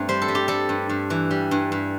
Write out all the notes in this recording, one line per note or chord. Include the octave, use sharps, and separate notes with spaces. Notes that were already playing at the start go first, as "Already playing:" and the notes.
Already playing: G2 A3 C4 D4
G3 C5
A4
G3
G4
G3 A4
G2
G2
E3
G3
G2
G2